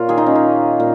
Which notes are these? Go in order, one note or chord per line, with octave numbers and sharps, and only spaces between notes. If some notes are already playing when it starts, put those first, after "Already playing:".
Already playing: A#2 F4 A#4 C#5
D#3 A#3 G#4
D#4
C#4
D#4
A#2